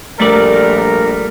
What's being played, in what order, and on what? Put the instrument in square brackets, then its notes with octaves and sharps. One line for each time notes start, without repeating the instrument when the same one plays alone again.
[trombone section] A#1 A#4 [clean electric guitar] G3 A3 D5